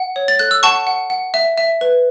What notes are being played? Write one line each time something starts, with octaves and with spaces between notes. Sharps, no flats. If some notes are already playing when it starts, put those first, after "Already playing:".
Already playing: F#5
C#5
A6
A4 F#6
E6
F#5 A5 C#6
F#5
F#5
E5
E5
B4